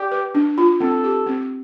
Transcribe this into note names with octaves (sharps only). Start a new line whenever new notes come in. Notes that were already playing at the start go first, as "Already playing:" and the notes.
Already playing: G4 D5
B4
D4
F4
C4 A4
G4
C4